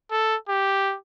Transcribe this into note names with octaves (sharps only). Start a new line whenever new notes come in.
A4
G4